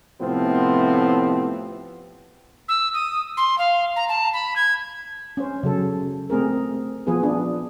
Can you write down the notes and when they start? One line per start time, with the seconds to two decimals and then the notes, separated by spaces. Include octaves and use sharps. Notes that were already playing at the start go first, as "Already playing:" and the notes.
0.21 A2 C3 F3 B3 C4
2.68 E6
2.93 D#6
3.37 C6
3.58 F5
3.96 A#5
4.08 A5
4.33 B5
4.56 G#6
5.37 C#4 C5
5.63 C#3 F#3 A4
6.30 A3 C4 G#4 A#4
7.07 F3 B3 F4 G#4 B4
7.23 D4 G#4